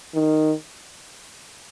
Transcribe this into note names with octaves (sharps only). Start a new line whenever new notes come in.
D#3